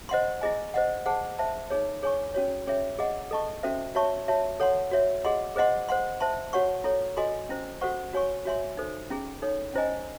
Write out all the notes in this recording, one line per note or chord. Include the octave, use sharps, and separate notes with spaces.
C5 D#5 F#5 C6
E4 G#4 D#5 G#5
C5 D#5 F#5
G#4 C5 F#5 A5
C5 E5 A5
D#4 G#4 C#5
G#4 C#5 G#5 C#6
C#4 F#4 C#5
C#4 G#4 C#5 E5
G#4 D#5 F#5
A4 D#5 A5 C#6
C#4 F#4 A4 C5 E5
F#4 C#5 E5 A5 C#6
F#4 C#5 E5 A5
A4 C#5 F#5 C6
F#4 C#5 E5
G#4 D#5 F#5 C6
G#4 C5 D#5 F#5 C6
C5 F#5 C6
C5 E5 A5 C6
F#4 C#5 F#5 C#6
E4 A4 C#5
F#4 A4 D#5 G#5 C6
C#4 E4 C5
F#4 A4 C5 F#5 C#6
F#4 C#5 G#5 C#6
F#4 C#5 E5 G#5 C6
D#4 A4 C5
C#4 E4 G#4
D#4 A4 C#5
C#4 E4 C5 D#5 G#5